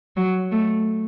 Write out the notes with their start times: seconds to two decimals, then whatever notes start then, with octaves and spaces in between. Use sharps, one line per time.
0.17 F#3
0.52 A3